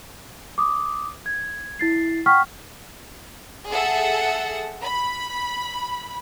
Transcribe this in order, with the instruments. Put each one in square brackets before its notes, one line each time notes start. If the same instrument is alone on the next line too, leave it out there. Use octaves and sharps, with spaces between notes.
[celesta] D6 D#6
G#6
E4 A6 C7
F#5 G5 C#6 F6 B6
[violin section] G#4 A4 E5 F#5
B5